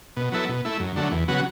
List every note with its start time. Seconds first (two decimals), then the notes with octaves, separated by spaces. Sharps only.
0.16 B2
0.32 F#3 B3 E4 A4
0.49 B2
0.65 A3 E4
0.80 F#2
0.96 D3 F#3 A3
1.12 E2
1.28 C#3 F#3 B3 F#4